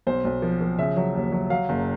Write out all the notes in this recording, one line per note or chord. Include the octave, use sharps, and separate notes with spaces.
B1 C5
B1
F3
F3
C#3 E5
F#3
D#2
F#3
F#3 F5
F#1